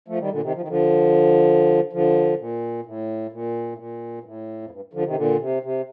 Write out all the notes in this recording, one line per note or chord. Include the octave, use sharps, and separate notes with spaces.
F3 A3
D#3 G3
A#2 D3
C3 D#3
F3
D#3
D3 F3
D3 F3
A#2
A2
A#2
A2
A#2
G2
A2
F2
G2
D3 F3
C3 D#3
A#2 D3
C3
C3